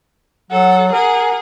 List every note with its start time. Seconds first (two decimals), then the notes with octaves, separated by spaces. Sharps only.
0.51 F#3 A4 F#5
0.92 G#4 A#4 F#5